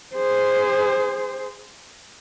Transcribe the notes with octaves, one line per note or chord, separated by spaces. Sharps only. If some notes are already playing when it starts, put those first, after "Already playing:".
G#4 C5